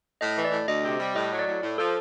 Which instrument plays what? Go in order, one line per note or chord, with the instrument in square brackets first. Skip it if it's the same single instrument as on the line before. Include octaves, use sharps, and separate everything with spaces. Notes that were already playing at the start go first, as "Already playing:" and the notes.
[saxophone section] A2 [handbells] D#5
[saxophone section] E3
[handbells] D5
[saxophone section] A2
[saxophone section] D2 [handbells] D#5
[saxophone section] C3
G3
[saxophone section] A2 [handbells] D#5
[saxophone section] F#3
[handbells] D5
[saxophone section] A2
A2
[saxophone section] F3 [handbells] A4